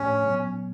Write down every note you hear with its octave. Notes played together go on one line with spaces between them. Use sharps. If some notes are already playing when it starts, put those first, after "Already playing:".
Already playing: A2 F3 A3 C#4 D4 G4
A#2 F#3 B3